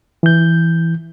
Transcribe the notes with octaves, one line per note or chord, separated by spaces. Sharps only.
E3 G6